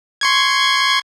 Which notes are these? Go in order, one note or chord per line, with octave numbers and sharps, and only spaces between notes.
C6 C#6 G#6